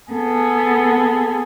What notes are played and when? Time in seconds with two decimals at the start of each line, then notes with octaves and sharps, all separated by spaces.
0.11 B3 G#4 A4